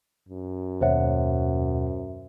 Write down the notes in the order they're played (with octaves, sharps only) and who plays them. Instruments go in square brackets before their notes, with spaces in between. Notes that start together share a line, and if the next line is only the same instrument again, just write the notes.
[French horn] F#2
[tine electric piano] D#2 B2 F#5 [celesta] C5 C#5 E5